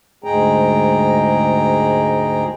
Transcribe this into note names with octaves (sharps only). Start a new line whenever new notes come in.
D2 G#2 G#3 G#4 G5 A#5